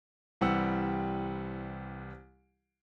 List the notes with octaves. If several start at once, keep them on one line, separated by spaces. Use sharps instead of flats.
C2 E3 G3 C4 F#5 E6